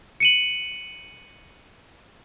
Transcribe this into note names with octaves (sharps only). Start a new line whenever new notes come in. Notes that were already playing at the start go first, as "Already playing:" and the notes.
C#7 D#7 F#7